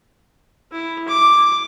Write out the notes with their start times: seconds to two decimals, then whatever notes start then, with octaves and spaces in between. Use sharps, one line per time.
0.71 E4
1.08 D6